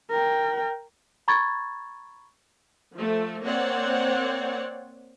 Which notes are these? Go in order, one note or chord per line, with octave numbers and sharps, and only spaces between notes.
A#4 G5
A#5 B5 C#6 G#6 A6
F3 A3
A#3 C4 C#5 D5 F#5